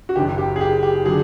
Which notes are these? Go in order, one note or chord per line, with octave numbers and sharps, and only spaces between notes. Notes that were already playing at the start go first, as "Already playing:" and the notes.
F#4
F#1 F#2 D#3 G4
G4
G#4
G4
G4
D3 F#3 G#4